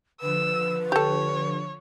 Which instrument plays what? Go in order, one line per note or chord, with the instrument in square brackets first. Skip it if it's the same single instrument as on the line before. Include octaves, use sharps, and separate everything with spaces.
[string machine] D3 F3 [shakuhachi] B4 [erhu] E6
[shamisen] G4 A4 [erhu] C#5